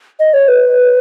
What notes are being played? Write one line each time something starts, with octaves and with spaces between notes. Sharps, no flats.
D#5
C#5
B4